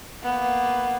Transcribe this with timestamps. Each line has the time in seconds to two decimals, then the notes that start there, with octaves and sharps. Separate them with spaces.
0.23 A#3 B3